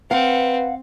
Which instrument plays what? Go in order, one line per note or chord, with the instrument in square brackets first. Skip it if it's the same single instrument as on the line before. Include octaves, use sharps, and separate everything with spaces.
[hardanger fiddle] C4 [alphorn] B4 [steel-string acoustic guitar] F5 F#5